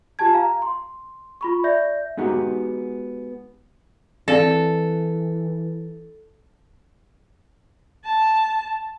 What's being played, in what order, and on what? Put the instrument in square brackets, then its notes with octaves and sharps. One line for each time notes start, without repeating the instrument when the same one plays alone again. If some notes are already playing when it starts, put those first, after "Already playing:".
[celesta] F4 G4 G#5 A5 G#6
F5 A#5
C6
F4 B5 C#6
D5 E5 G6 A#6
[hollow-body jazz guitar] G#3 B3 D#4 F#4 G4
[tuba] E3 [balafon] C4 D5 F5 [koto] A4
[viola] A5